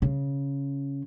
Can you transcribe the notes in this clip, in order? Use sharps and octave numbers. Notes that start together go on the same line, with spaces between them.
C#3